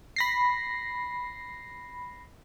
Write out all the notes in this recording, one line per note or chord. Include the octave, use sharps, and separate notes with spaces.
B5 A#6 C7